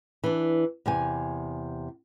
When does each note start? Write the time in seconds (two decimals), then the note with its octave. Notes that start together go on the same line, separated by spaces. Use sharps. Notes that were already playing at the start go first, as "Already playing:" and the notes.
0.24 E3 D4
0.86 E2 C3 G#5